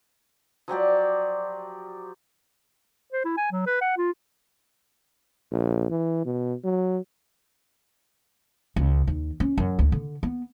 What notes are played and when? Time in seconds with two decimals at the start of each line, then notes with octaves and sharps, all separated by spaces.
0.68 F3 F#3 G4 D5
3.13 C5
3.25 E4
3.37 G#5
3.52 F#3
3.66 B4
3.81 F#5
3.97 F4
5.52 A#1
5.91 E3
6.25 B2
6.64 F#3
8.76 C#2
9.07 D#2
9.40 C#4
9.58 F#2
9.79 D2
9.92 D3
10.23 B3